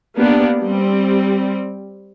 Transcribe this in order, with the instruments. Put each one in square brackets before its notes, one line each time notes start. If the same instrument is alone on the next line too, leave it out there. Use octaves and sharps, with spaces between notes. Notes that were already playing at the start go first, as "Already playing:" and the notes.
[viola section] A#3 B3 D4 G4
G3 C4